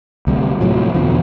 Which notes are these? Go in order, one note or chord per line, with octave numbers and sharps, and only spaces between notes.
D2 C3 G3
A2 C3 F3 F#3
E2 B2 D3 F3